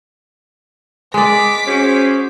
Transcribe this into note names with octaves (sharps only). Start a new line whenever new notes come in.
G#3 D5 D6 B6
C#4 F#4 G#4 C5